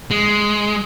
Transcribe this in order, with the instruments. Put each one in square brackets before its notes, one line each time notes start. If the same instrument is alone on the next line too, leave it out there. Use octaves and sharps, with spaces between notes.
[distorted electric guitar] G#3